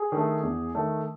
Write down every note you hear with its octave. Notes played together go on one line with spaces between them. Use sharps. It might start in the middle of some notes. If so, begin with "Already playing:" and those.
Already playing: G#4
D#3 A3
E2
D#3 A3